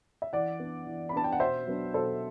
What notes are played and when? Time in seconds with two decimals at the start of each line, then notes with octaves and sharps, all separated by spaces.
0.22 E5
0.33 E3 D5 F#5
0.60 B3 D4
0.87 E3
1.09 B5
1.13 B3 D4 A5
1.24 G5
1.32 F#5
1.40 B2 C5 E5
1.67 F#3 B3 D4
1.94 B2 A4 C5